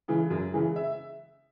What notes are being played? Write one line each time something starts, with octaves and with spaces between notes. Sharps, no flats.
C#3 E3 G#3
F#2
C#3 E3 G#3
E5